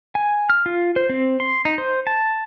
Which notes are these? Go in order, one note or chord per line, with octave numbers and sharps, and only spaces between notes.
G#5
F6
F4
C5
C4
C6
D#4
C5
A5